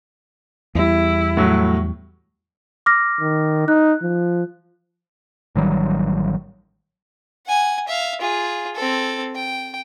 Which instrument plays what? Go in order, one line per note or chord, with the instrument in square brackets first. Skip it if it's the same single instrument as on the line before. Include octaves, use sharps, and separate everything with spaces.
[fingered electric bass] E2 G3 [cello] E4
[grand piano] A2 F#3
[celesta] D6 F6 A#6
[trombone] D#3
[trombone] D#4 [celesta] F#6
[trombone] F3
[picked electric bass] A1 D#3 F#3 G3
[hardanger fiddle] F#5 G#5
E5 F5
F4 G#4
C4 A4
G5